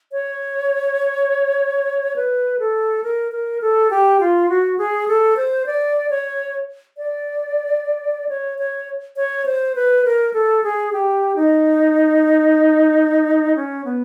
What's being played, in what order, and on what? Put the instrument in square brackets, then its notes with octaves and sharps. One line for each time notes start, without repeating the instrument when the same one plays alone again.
[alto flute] C#5
B4
A4
A#4
A#4
A4
G4
F4
F#4
G#4
A4
C5
D5
C#5
D5
C#5
C#5
C#5
C5
B4
A#4
A4
G#4
G4
D#4
C#4
B3